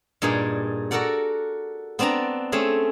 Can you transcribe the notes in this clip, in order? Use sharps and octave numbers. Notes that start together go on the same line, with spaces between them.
G2 A#2 D#4 G#4 D5
F#4 A4 A#4 D5 F#5
B3 C4 D4 D5 A#5
A3 C4 C#4 G#4